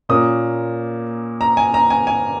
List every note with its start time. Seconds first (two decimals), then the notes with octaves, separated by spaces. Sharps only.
0.09 A#2 A#3 C#4 D#6
1.41 A#5
1.57 G#5
1.74 A#5
1.90 G#5
2.07 G#5